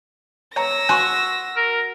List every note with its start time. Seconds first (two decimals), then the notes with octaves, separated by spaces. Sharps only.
0.56 C#5 A#5 E6 A#6
0.89 F#4 G#5 C6 C#6
1.56 A#4